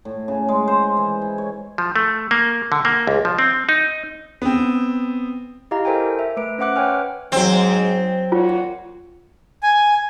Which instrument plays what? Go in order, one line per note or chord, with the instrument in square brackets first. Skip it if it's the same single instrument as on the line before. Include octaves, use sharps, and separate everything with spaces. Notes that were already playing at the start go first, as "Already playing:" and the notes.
[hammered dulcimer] A2
C#3
G#3
C5
E3
E4
C#5
[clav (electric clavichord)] F3
A3
A#3
D3
A#3
C#2
F3
C4
D#4
[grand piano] B3 C4
[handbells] E4 G4 D#5 F5 A#5
A4 A#4 C5 D#5 G5 G#5
E5
A3 B4 D7
C#4 C5 E5 F#5 D6 F#6
B4 C#5 G5 G#5 F6
[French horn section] G#2 [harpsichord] F#3 C5 [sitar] C4
[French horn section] A#2 F#4 C#5 [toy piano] F4
[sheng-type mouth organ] G#5